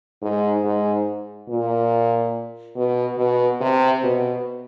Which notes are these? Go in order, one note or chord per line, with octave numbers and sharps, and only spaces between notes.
G#2
G#2
A#2
B2
B2
C3
B2